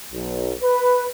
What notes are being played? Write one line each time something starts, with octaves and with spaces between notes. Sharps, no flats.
B1
B4